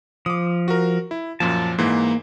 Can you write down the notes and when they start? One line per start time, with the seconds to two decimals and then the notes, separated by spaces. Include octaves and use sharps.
0.26 F3 D6 D#6
0.68 F#4 A#4
1.11 E4
1.40 F#2 A#2 F3 A5
1.78 G#2 E3 A#3